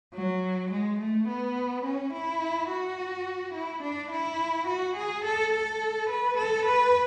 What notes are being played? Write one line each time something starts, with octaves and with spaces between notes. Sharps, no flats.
F#3
G#3
A3
B3
C#4
E4
F#4
E4
D4
E4
F#4
G#4
A4
A4
B4
A4
B4